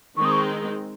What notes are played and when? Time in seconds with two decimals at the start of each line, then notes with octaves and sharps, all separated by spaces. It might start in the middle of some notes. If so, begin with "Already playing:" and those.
0.17 D#3 G#3 C4 D#4 C#6
0.25 D#6
0.32 C#6